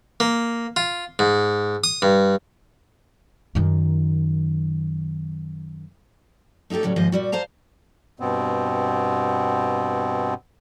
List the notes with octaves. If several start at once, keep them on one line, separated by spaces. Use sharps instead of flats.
A#3
F4
G#2
D#6
G2
F#2 D#3
A3 D#4 F4 G4 A4
A2 C#3 F#3 G3
D#2 G#2 F3 C5 D#5
A#2 G3 F#4
C5 F5 A5 A#5
G2 B2 B3 C4